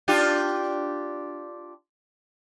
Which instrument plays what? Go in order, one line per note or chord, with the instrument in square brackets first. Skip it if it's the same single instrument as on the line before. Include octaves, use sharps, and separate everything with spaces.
[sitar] D4 F4 G4